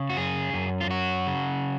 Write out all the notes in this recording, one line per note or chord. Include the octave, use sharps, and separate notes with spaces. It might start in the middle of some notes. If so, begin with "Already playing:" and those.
Already playing: C#3
F#4
F#2 G#4
F#2
F4
F#3 F#4
C#3